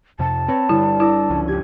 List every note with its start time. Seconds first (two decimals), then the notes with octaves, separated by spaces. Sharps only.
0.19 F2 C3 A5
0.48 C4 B4 C#5 A#5
0.69 G1 D3 G3 E4
1.00 E4 D6 E6 A#6
1.30 C#2 F3 C#4
1.48 G1 G4 G#6